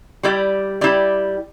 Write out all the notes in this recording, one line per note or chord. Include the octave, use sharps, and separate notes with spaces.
G3 E4 G4 D5
G3 E4 G4 D5